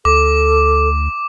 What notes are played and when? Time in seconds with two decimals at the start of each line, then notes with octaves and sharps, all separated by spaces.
0.05 D2 A4 D6